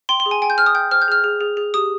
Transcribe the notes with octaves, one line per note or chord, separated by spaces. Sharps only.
G5 C6
C6
G#4
G#5
G5 G#5
G6
C5 F6
D#6
G5 G6
C5 F6
G6
G#4 F6
G#4
G#4
G#4
G4 D#6